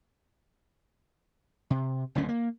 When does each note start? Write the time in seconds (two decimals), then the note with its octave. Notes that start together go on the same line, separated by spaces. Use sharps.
1.70 C3
2.15 F#1 D2 A#2 C#4
2.28 A#3